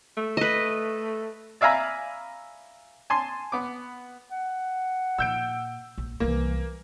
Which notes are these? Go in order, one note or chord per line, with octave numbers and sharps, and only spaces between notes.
A3
B4 D#5
D5 E5 F5 G#5 A#5 B5
G#5 A5 C6
B3 D6
F#5
A#2 E6 G6 D7
A#1
C2 E3 F#3 A#3